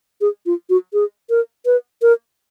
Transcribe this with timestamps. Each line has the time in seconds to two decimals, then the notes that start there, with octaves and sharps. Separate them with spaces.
0.21 G#4
0.46 F4
0.70 F#4
0.93 G#4
1.30 A#4
1.66 B4
2.02 A#4